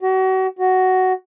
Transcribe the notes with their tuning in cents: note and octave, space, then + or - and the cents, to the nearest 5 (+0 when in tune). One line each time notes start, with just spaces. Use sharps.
F#4 +35
F#4 +10